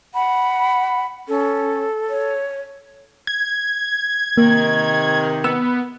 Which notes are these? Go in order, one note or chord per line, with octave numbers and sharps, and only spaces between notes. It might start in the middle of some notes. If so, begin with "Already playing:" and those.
F#5 B5
C#4 A4
C#5
G#6
C3 D#3 A#3
B3 E6